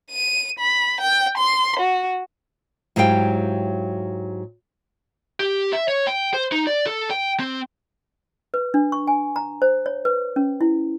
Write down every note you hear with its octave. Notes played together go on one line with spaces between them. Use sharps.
D#7
B5
G5
C6
F#4
G#2 F#3 E4 G4 F5 G5
G4
E5
C#5
G5
C5
D#4
D5
A4
G5
C4
B4
D4
C#6
G#5
A#5
C5
C#5
B4
C#4
E4